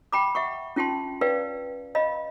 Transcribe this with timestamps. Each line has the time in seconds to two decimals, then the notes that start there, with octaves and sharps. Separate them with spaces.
0.12 G5 B5 D6
0.35 E5 F#5 C#6
0.76 C#4 F4 G5 A5 C6
1.21 B4 D5 F5 G5
1.95 D#5 F5 B5